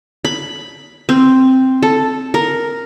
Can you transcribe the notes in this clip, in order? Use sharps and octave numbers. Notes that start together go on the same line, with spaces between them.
B5
C4
A4
A#4